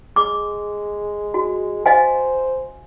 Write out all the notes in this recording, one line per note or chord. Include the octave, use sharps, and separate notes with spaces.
G#3 D6
F#4
C5 D#5 F5 G#5